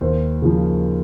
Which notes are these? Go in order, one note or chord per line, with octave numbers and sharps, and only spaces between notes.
D#2 C5
C#3 F3